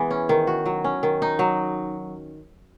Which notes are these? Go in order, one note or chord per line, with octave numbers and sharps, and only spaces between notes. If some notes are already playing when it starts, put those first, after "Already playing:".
Already playing: E3 G#3 B3
C#4
D#3
F#4
F#3
C#4
D#3
D#4
F#3